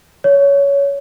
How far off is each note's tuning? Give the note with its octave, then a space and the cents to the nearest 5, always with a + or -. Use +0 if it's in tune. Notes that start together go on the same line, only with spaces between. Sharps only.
C#5 +15